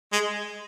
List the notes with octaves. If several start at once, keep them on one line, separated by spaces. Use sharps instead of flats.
G#3